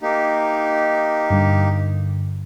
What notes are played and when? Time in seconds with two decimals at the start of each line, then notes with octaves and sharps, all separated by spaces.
0.01 A#3 D#4 G4
1.30 G2 D3 G3